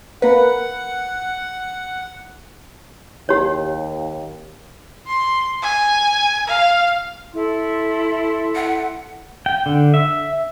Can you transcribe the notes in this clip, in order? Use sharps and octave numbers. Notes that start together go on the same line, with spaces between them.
A#3 B4 F#5
D#2 G4 C#5
C6
G#5
F5
E4 A4 C6
F#5
G5
D3
E5